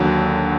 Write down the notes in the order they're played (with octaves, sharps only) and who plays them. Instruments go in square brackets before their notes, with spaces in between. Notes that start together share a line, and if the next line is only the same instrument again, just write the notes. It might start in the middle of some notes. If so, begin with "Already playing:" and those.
Already playing: [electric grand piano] D#2 D3 F#3